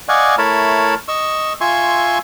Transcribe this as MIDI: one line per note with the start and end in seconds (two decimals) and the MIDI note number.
0.09 0.35 74
0.09 0.35 75
0.09 0.35 77
0.09 0.35 78
0.09 0.35 80
0.09 0.35 85
0.38 0.95 57
0.38 0.95 64
0.38 0.95 70
0.38 0.95 73
0.38 0.95 81
0.38 0.95 83
1.08 1.53 75
1.08 1.53 85
1.08 1.53 88
1.61 2.18 65
1.61 2.18 76
1.61 2.18 80
1.61 2.18 84
1.61 2.18 85